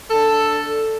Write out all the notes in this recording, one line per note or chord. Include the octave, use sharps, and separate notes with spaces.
D4 A4